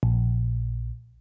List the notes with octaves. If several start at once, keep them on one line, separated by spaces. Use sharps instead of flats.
A#1